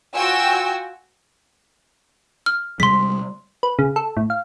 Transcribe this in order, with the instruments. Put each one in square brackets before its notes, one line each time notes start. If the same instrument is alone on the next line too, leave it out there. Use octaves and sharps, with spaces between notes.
[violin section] F4 F#4 G5 G#5 E6
[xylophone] F6
[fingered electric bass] C3 G3 G#3 [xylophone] C6 B6
[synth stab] B4
C#3
A4
A2
F5